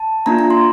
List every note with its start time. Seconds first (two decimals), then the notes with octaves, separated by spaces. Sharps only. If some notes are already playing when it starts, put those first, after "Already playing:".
Already playing: A5
0.26 A#3 D4 F4 A#5
0.39 A#5
0.50 C6